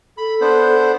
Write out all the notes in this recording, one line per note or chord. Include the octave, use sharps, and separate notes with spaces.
A4 B5
B3 D4 C5